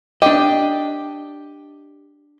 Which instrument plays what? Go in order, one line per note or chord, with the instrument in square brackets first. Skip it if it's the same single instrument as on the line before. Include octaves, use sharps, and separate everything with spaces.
[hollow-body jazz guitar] D4 D#5 [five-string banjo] G4